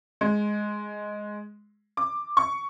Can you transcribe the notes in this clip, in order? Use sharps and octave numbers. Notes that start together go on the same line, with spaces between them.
G#3
D6
C#6